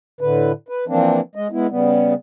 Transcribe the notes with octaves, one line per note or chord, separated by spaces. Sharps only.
A2 D3 B4
B4
E3 F3 A#3 C4 D4
G#3 D#5
G#3 B3 E4
C#3 G3 B3